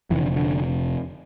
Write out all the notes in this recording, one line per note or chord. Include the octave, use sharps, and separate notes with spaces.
F1 F2 C3 E3
D3
D3